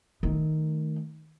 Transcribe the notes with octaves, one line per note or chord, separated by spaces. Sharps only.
D#3 A3